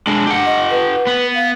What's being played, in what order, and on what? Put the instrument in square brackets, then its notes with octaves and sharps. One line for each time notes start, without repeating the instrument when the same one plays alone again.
[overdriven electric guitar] G#3 D4
G4 F#5
[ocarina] D#5
B4
[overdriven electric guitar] B3
[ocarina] F5